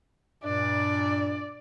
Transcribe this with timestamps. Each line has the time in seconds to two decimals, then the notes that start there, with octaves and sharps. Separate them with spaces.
0.44 G2 A#2 D4 D5